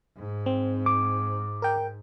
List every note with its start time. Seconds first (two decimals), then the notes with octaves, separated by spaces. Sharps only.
0.17 G#2
0.46 C4
0.86 D6
1.62 A#4 G5